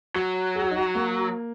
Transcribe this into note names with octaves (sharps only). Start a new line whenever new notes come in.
F#3 F#4
G#4
F#4
D#4
F#4
A#3